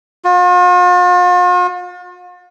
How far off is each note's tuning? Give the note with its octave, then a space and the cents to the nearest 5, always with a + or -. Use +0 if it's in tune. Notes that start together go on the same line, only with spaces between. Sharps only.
F4 +45